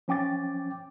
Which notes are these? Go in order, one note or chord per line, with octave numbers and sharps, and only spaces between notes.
F3 C#4 G5 D6 A6